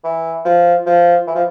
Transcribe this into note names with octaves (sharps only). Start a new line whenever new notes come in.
E3
F3
F3
E3
F3